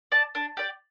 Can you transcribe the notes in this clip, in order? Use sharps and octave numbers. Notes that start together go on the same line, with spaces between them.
D5 A5
D4
G4 D5